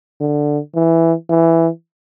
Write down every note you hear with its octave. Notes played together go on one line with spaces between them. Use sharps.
D3
E3
E3